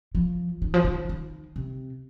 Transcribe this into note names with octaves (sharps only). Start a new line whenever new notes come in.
F3
D#3
F3
D#3
D#3
C3